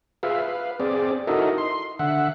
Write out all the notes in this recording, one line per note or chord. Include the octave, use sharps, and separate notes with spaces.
F4 G#4 B4 E5 F5
B4 F5
C4 G#4 D5
D#4 E4 F#4 A4 A#4 D#5
C6
D3 E5 F#5